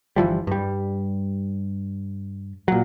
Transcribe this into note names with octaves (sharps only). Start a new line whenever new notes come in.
G1 E3 F3 G3
G2 G3
A#2 F#3